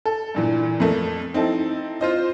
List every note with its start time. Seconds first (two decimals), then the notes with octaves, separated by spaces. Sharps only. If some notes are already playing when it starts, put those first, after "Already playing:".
0.06 A4
0.35 G2 A#2 E3
0.80 F2 A3 A#3
1.34 C4 D#4 E4 A4
2.01 F4 C5 D#5